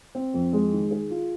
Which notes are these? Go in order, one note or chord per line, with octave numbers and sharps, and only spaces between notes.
C4
F2
G#3
D#3
G#4
F4